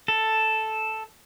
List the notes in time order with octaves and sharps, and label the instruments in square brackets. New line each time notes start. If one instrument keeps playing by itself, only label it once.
[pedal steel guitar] A4